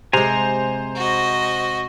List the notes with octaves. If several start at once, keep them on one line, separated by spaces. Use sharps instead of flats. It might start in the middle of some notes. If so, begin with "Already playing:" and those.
C3 G#3 C5 G#5 A#5
F#4 D#5